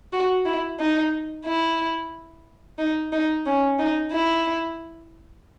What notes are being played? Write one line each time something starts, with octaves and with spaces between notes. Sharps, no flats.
F#4
E4
D#4
E4
D#4
D#4
C#4
D#4
E4